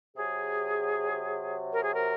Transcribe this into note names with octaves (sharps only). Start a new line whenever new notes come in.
C3 F#3 G#4
A#4
G#4
A#4